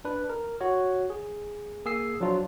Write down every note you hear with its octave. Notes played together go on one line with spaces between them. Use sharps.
D4 B4
A#4
F#4 C#5
G#4
A#3 G#4 G#5 E6 C7
F3 F#3 D4 F4